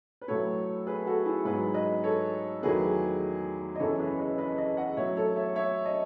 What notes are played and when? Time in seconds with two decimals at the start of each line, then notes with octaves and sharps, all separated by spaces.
0.21 B4
0.28 A2 F#3 A3 A4 C#5
0.87 G#4 B4
1.06 F#4 A4
1.26 E4 G#4
1.45 G#2 F#3 B3 G#4 B4
1.74 B4 D#5
2.04 A4 C#5
2.63 E2 D#3 F#3 A3 G#4 B4
3.76 D#5
3.80 F#2 C#3 E3 B3 A4 C#5
3.99 G#4 B4
4.19 B4 D#5
4.38 B4 D#5
4.58 B4 D#5
4.77 D#5 F#5
4.97 A2 F#3 B3 C#5 E5
5.17 A4 C#5
5.36 C#5 E5
5.55 C#5 E5
5.85 D#5